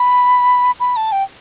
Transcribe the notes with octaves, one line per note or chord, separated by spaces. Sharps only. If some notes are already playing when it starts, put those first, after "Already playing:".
Already playing: B5
B5
A5
G5